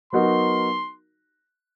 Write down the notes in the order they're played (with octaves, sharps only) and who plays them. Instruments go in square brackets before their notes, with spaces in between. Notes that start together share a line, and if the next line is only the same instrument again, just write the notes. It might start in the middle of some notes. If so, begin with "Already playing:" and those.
[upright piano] F#3 B3 D#4 F#4 A#4 [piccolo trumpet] C6